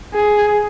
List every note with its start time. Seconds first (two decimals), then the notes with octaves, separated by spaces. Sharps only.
0.14 G#4